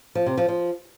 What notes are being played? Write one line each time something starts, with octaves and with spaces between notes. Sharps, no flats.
F3
C3
F3
F3